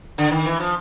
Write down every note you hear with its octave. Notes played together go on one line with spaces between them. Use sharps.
D3
D#3
E3
F3